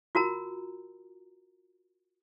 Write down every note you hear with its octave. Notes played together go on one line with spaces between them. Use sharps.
F4 F#4 A#4 A#5